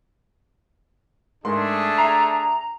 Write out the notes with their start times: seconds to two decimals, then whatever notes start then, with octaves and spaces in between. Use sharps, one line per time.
1.45 G#2 A3 D4 G#4 A#4 C6
1.98 E5 A#5 C7